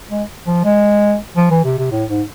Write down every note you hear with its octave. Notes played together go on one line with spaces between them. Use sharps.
G#3
F3
G#3
F3
E3
C3
C3
A2
G#2